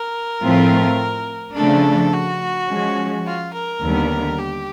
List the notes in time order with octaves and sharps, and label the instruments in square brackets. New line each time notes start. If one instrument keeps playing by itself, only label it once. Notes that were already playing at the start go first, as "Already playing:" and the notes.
Already playing: [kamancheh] A#4
[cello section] A2 F3 A3 C4 F4
[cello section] C#3 F3 A3 D4 [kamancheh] A4
[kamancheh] F#4
[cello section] F3 G#3 C#4
[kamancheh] F4
A#4
[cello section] D#2 D3 G3 B3
[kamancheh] G4